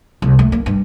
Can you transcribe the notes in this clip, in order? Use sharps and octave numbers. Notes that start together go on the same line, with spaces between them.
C2
A3
A#3
G2